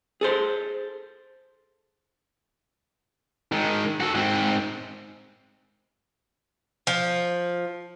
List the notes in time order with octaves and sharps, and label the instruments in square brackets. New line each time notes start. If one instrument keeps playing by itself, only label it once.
[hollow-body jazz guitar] G#4 A4 C5
[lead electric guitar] D#3 G#3
F#4 A4
G#2 C4
[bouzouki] F3